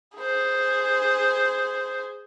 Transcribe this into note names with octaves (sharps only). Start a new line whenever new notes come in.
G#4 C5